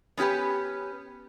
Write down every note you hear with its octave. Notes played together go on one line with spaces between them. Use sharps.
B3 C#4 F#4 G4 B4